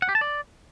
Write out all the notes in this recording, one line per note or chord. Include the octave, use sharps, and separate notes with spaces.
F#5
G4
A5
D5